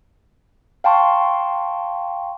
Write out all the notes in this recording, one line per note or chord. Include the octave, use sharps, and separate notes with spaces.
F5 G5 A5 C6 C#6